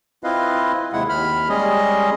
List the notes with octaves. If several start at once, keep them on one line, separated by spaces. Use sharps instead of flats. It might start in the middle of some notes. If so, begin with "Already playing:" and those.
C4 E4 F4 B4 D#5 F5
D#2 C3 G#3 E4 F#5
D#2 B5 F6
G3 G#3 C#4 G#4 D#5